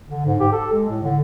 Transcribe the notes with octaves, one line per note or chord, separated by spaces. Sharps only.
D3
G#2
G4
A4
G#3
A2
D3